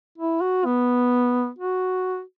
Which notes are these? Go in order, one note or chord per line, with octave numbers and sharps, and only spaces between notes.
E4
F#4
B3
F#4